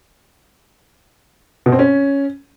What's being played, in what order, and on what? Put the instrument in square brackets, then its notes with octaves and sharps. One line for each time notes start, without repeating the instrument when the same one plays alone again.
[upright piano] B2
C4
C#4